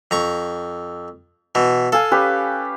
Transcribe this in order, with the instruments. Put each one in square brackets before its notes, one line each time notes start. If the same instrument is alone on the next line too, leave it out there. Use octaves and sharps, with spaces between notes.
[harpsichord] F2 A#5 C#6
B2 E3
[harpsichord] A4 [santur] F5 G#5
[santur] C#4 G4 B4